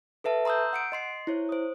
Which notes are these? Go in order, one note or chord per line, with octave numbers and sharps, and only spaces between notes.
A4 B4 E5 A5
A#5 C6 D#6 E6 G6
F#5 C#7 D7
D#5 C6 C7
E4 C5 C#5
C5 D#6